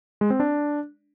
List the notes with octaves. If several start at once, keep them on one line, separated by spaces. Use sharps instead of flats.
G#3
C4
D4